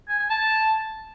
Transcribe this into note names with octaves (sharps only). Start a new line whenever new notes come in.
G#5
G#5
A5